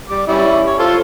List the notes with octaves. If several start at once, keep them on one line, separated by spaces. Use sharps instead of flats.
G3 D6
G3 C#4 E4
C#5
F4 A4 C5